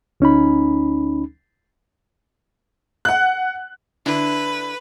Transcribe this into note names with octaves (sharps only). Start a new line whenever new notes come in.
D2 C#4 D#4 B5
F#5 F#6
D3 D4 E4 B4